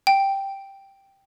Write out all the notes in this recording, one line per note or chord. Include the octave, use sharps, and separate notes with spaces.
G5